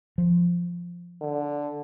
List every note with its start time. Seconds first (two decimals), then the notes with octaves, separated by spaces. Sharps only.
0.18 F3
1.21 D3